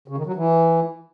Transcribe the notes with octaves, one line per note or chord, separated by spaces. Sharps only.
C#3
D#3
F#3
E3